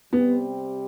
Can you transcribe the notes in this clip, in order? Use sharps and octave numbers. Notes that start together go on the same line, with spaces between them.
C3 G3 B3 C4 G4